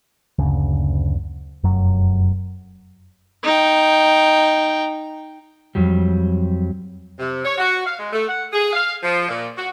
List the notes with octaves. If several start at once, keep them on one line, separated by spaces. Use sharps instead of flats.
F#1 D2 C#3
F1 F#2 F#3
D#4 G5
F2 F#3 G3
C3
C#5
F#4
F5
G#3
A3
F#5
G#4
F5
F3
A#2
F#4